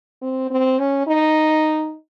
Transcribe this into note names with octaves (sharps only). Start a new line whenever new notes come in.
C4
C4
C#4
D#4